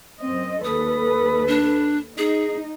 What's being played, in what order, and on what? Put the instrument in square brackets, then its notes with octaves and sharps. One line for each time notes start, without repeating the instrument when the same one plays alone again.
[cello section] F#2 C4 D#5
[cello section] D#2 A4 B4 [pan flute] D#6
[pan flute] D4
[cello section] D#4 [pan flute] G#4